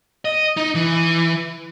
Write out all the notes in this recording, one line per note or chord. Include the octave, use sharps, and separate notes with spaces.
D#5
D#4
E3